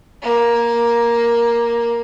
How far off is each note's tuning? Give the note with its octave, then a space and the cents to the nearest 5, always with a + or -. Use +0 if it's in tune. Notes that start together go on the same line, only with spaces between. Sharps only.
A#3 +10